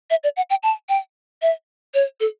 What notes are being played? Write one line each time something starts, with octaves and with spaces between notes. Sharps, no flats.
E5
D5
F#5
G5
A5
G5
E5
C#5
A4